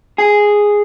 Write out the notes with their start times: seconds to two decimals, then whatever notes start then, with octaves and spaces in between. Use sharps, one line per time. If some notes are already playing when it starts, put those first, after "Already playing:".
0.18 G#4